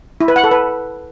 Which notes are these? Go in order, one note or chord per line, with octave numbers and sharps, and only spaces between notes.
E4
B4
F#5
A4
B4